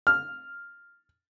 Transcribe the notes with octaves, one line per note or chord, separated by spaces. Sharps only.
F6